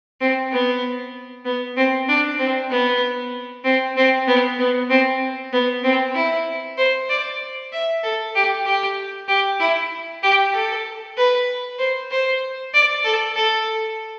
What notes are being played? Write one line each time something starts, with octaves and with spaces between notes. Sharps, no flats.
C4
B3
B3
C4
D4
C4
B3
C4
C4
B3
B3
C4
B3
C4
E4
C5
D5
E5
A4
G4
G4
G4
E4
G4
A4
B4
C5
C5
D5
A4
A4